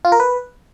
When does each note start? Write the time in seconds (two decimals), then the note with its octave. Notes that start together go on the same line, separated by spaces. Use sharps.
0.05 F4
0.12 A#4
0.20 B4